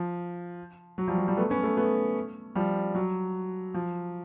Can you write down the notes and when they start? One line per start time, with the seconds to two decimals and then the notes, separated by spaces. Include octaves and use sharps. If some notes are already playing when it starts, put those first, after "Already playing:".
Already playing: F3
0.98 F#3
1.07 F3 G3
1.18 F#3
1.28 F3 G3
1.37 A3 B3
1.50 B3 C#4
1.64 A3 B3
1.77 A3 B3
2.55 F3 G3
2.95 F#3
3.74 F3